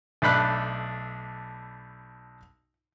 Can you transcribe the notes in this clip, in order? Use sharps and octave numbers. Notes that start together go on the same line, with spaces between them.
B1 A3 D4 B5 F#6